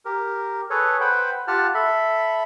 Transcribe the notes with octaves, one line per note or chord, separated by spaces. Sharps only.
G4 A#4
G#4 A4 B4 C#5
B4 C5 F#5 G5 B5
F4 G4 F#5 A5 F6
A4 E5 B5